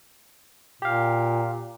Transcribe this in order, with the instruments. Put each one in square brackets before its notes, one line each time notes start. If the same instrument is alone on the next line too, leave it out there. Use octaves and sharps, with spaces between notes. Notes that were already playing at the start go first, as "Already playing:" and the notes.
[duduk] A#2 [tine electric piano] G4 F5